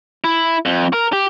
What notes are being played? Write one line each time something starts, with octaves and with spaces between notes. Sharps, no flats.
E4
F2
A#4
G4